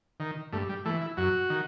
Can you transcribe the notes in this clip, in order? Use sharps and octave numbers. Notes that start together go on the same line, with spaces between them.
D#3
G2 A3
G3
E3 A3
E4
F#2 F#4
D#3